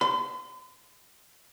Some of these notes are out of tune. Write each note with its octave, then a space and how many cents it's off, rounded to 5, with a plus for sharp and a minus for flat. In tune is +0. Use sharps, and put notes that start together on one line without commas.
C6 -45